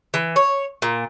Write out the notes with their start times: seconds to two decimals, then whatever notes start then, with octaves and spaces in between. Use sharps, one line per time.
0.14 E3
0.36 C#5
0.82 A#2